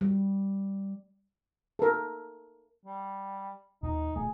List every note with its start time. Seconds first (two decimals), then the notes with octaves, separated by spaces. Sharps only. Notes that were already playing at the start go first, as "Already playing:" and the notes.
0.01 G3
1.79 A4 A#4
2.86 G3
3.83 D#2 A#2 D#4
4.16 D1 A#2 A3 G#4